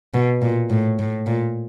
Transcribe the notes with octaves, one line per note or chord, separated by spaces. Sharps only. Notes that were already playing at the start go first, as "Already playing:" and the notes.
B2
A#2
A2
A2
A#2